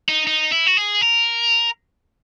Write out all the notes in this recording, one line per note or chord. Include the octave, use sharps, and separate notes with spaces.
D#4
D#4
E4
F#4
G#4
A#4